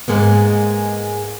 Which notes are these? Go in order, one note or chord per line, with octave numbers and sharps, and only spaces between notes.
G#2 G#3 A#3 B3